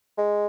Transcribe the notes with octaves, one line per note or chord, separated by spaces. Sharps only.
G#3